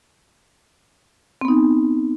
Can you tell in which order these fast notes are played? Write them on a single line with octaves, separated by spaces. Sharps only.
C4 B3 D#4